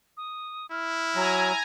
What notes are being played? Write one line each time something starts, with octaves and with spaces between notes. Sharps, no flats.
D#6
E4 F6
F#3 G#5 A#5